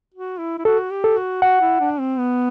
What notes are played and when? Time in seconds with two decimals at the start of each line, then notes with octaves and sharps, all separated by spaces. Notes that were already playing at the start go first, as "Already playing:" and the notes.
0.14 F#4
0.39 E4
0.58 E4
0.65 F#4 A4
0.91 G4
1.04 A4
1.16 F#4
1.42 F#4 F#5
1.62 E4
1.80 D4
2.00 C4
2.19 B3